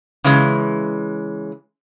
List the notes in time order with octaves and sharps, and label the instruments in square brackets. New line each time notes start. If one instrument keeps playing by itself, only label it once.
[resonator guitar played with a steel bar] C#3 E3 G#3